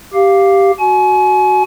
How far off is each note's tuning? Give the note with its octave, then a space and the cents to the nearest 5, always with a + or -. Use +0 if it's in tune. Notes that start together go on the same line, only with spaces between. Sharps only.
G4 +0 F5 +0
F#4 +0 G#5 +35